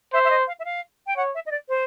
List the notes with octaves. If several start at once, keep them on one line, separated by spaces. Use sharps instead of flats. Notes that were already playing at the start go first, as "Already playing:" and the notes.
C5 E5
E5
D#5
F5
E5
F5
G5
C#5 F#5
E5
D#5
D5
C5